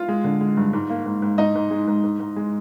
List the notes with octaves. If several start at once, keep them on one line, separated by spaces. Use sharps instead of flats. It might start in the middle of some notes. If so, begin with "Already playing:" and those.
Already playing: F4 F5
G#3
D3
G#3
G2
G#2
A#3
G#2
G#2
G#2 D#4 D#5
G#2
G#3
G#2
G#2
G#2
G#3